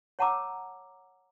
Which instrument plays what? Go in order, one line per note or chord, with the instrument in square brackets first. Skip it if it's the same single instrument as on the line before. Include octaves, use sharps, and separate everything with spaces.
[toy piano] C#5 F#5 A5 A#5 D6 E6